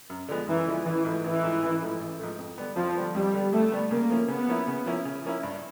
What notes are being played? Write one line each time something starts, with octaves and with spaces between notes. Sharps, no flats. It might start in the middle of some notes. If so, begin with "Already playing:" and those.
F#2
D3 F3 G#3 B3
F#2 E3
D3 F3 G#3 B3
A1 E3
G#2 F3 A3
A1 E3
G#2 F3 A3
A1
G#2 F3 A3
A1
G#2 F3 A3
F2
D3 G3 B3
F2 F3
D3 G3 B3
F2 G3
D3 G3 B3
F2 A3
D3 G3 B3
C#3 A#3
F3 A#3 C#4 E4
C#3 B3
F3 A#3 C#4 E4
C#3
F3 A#3 C#4 E4
C#3
F3 A#3 C#4 E4
G2